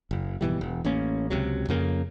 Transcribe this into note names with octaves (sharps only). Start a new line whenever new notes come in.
F#1
G#1 B2 E3 G3
E1
A1 A#3 C#4
C#2 C3 F#3
F2 C#3 A#3